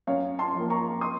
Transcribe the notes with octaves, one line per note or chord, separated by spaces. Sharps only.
F#2 C#5 F5
A5 C6
F3 A#3
A#5 C#6
C6 D#6